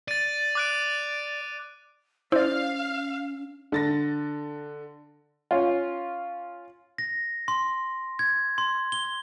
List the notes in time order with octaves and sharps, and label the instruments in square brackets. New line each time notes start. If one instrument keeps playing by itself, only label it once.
[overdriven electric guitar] D5 [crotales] A6 D#7
[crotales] D6 F#6 D7
[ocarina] C#4 [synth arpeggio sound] E4 [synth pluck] C5 D5 [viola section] F5
[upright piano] D3 A6 A#6
[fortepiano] C#4 F4
[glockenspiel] A#6
C6
G#6
C6
G7